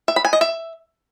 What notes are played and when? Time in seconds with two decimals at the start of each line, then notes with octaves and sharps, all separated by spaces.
0.08 E5
0.16 B5
0.25 G#5
0.33 D#5
0.41 E5